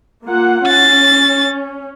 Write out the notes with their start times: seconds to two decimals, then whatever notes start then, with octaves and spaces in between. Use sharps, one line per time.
0.24 A#3 F4 F#5
0.68 C#4 A6